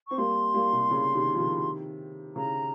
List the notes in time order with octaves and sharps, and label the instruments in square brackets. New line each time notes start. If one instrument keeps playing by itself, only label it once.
[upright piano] C4 [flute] C#6
[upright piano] G3 A#3 [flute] C6
[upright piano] G3 A#3
C3
C#3
C3 D#3
F3
C3 D#3
[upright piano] C#3 [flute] A#5